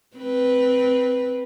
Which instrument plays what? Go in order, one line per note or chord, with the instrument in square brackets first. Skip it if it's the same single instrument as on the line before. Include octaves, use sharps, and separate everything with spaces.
[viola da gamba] C4 B4